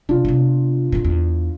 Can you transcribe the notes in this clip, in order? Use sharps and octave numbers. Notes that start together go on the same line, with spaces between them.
C3 D4 F4
C3 B3
A1 A#2
E2